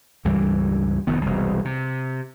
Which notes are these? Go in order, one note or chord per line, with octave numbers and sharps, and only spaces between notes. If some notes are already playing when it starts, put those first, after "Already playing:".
C#2 G2 E3 G3
F1 D#3 B3
E1 C2
C3